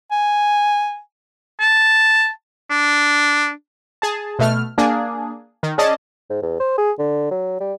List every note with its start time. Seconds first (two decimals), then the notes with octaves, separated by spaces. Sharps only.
0.11 G#5
1.61 A5
2.70 D4
4.02 G#4 A5
4.39 B2 A3 F6
4.78 A#3 D4 G#4
5.63 D#3
5.78 C#4 G#4 D5 D#5 A5
6.30 G#2
6.42 E2
6.60 C5
6.78 G#4
6.99 D3
7.31 F#3
7.61 G3